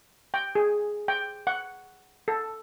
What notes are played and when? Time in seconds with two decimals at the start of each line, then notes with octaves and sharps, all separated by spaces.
0.34 G5
0.55 G#4
1.08 G5
1.47 F#5
2.28 A4